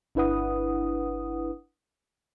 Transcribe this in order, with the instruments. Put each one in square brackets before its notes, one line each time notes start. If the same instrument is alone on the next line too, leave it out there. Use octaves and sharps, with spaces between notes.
[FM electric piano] G1 D4 E4 B4 F#5 D#6